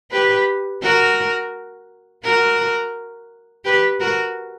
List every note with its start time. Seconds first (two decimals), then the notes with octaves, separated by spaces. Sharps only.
0.11 G4 B4
0.82 F#4 A#4
2.24 F#4 A#4
3.65 G4 B4
4.00 F#4 A#4